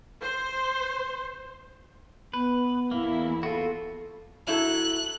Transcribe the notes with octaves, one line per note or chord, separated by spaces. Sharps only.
C5
B3 B4
E2 A#3 E4
F4 F#4 A4
F#3 E4 A4 F#6